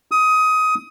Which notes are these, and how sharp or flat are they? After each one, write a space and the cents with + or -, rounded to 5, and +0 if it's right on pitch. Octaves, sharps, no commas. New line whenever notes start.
D#6 +20